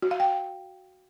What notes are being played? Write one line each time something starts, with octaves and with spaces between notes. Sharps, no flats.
F#4
F5
G5